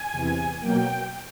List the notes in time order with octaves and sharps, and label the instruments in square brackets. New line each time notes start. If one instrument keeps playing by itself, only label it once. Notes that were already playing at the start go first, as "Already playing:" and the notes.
Already playing: [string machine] G#5
E2 C3 E3
B2 F#3 A#3 G5